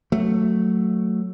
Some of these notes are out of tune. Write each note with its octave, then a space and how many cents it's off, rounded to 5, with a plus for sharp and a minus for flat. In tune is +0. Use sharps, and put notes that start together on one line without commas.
F#3 +0 A3 +5